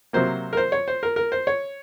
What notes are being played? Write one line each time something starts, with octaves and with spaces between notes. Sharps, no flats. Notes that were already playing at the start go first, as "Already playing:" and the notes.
C3 F#3 A#3 C5
A#4
C5
C#5
C5
A#4
A#4
C5
C#5